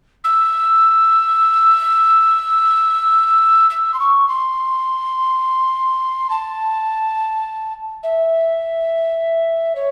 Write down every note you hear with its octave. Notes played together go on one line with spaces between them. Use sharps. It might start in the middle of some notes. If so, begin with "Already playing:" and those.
E6
E6
C6
C#6
C6
A5
E5
C#5